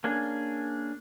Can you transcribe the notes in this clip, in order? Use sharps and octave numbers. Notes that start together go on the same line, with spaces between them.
A#3 C#4 D4 G#4